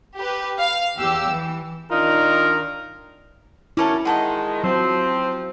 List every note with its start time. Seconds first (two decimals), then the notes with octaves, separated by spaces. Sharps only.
0.16 G4 B4
0.57 F5
0.98 E2 G4 E6
1.31 E3
1.92 D#3 D4 D#4 F4 A#4
3.77 F#3 C#4 E4 A4 A#4 D5
4.05 D#3 G#3 F#4 A4 D#5
4.64 F3 F#3 C4